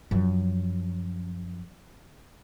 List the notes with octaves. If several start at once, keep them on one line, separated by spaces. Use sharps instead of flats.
F#2 F3